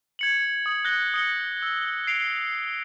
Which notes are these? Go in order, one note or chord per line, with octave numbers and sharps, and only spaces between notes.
G#6 C#7 F#7
D#6
F#6 G6 A#6 G7
D#6 C#7 G7
E6
C7 D7 F7